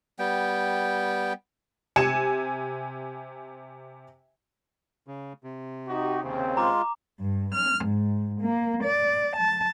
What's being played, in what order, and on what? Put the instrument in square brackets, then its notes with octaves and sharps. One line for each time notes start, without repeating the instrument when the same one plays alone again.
[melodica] G3 B3 G5
[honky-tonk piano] C3 G#5 C#7 E7
[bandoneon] C#3
C3
[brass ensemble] D#4 F#4 G4
D#2 C#3 C4
[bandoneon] G#3 F4 [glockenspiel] A#5 D6
[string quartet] G2
F6
G#2
A#3
D5
A5